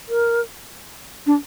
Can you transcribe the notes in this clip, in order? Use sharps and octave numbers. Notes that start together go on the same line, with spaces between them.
A#4
D4